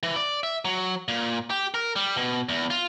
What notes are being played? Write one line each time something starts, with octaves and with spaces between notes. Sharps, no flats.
E3
D5
E5
F#3
A#2
G4
A#4
G3
B2
E2
F4